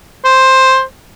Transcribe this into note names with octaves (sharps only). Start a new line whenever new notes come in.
C5